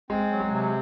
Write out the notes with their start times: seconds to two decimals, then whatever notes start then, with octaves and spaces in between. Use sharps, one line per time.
0.10 G#3 C4
0.31 F#3
0.40 G#3
0.50 C3